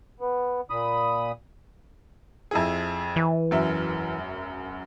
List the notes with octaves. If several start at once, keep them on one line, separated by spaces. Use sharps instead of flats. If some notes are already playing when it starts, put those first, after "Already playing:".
B3
A#2 B5 D#6
F2 E4 G#4
E3
E1 F#2 E5